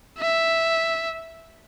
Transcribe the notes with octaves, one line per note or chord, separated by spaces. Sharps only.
E5